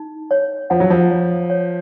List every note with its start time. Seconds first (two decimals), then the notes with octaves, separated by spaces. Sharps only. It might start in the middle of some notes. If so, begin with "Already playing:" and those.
Already playing: D#4
0.31 C#5
0.70 F3 F#5
0.80 F#3
0.90 F3
1.10 C#5
1.50 C#5